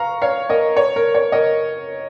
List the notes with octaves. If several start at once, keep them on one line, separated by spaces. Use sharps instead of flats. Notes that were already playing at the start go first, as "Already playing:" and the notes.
Already playing: F5 A#5 C#6
C#5 F5
A#4 D#5
C#5
A#4
C#5
A#4 D#5